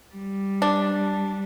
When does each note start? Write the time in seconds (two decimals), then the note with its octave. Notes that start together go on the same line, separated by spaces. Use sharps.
0.15 G3
0.62 D4